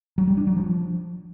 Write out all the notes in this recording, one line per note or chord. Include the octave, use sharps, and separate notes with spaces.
F#3
G3
D4
F#3
F3